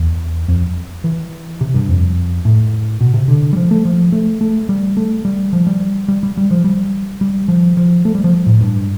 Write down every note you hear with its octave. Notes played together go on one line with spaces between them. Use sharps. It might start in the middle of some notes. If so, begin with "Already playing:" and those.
Already playing: E2
F2
E3
C3
G2
F2
A2
B2
C3
D3
G3
F3
A3
F3
A3
A3
G3
A3
G3
F3
G3
G3
G3
G3
F3
G3
G3
F3
F3
A3
G3
F3
A2
G2